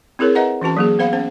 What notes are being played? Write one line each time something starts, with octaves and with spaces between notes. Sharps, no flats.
C4 E4 G#4 A#4 C#5
B4 D#5 E5 F#5 A#5
E3 C#4 F#4 A5
F#3 A#3 G#4
B3 C5 F5 B5
B3 C#4 C5